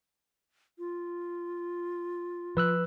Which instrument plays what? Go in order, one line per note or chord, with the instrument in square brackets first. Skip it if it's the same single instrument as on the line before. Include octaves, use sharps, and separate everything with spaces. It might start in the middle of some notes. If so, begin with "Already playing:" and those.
[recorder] F4
[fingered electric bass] F3 [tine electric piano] B4 E6 F#6